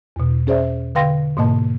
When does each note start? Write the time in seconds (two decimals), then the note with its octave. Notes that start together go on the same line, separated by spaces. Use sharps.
0.16 E2 B2
0.47 C#4 G#4 C5 D5 E5
0.95 D3 B4 F5 G5 C6 A#6
1.37 G#2 B2 A#3 D#5 A5